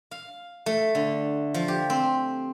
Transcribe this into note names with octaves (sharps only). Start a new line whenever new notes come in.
F5
A3
D3
F3
G4
C4